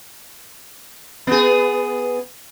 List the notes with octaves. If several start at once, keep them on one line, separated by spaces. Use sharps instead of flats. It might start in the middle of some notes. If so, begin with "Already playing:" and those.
B3 G#4